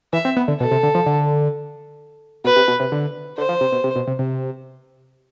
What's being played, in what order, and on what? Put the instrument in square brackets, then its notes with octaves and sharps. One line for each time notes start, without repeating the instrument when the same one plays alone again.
[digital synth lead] E3 [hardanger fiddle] E5
[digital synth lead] C4
B3
D3
[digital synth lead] B2 [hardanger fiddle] A4
[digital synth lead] C3
D3
F3
D3
[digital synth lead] B2 [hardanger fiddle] B4
[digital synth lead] C3
B2
C3
D3
[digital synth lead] D3 [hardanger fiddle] C5
[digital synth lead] F3
C3
B2
C3
B2
C3
C3